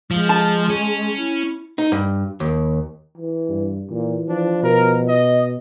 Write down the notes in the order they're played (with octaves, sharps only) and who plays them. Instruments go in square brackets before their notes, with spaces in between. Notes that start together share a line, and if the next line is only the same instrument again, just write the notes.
[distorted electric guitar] F3 [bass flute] G#3
[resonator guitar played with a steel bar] A5
[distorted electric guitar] C#4
[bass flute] E4
[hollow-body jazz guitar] D#4
G2
D#2
[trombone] E3
[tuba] G2
[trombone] A#2 [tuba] E3
[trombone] F3 [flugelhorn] D4
[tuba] B2 [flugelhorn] A#4
[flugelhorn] D#5